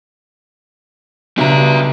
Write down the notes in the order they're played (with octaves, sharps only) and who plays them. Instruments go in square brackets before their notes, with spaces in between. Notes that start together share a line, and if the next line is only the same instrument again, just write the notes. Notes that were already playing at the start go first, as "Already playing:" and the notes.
[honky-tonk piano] B1 A#5 [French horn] G2 [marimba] C#3 [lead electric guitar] D4 E5